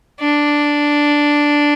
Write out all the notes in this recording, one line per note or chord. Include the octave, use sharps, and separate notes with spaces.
D4